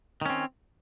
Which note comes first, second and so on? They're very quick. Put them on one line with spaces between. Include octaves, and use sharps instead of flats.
D#3 C#4 C4